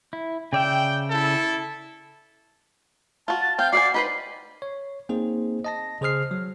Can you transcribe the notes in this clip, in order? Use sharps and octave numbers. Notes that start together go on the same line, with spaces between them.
E4
C#3 D5 E5 G5
E4 A4
F4 F#4 A5
A6
C4 F5 G5 G6
F#4 D5 F5 G#5 C7
D#4 B4 C5 B5
C#5
A#3 C4 D#4 G#4 C5
D#5 A5 A#6
C#3 G#4 C5 D#6 F6 C7
F#3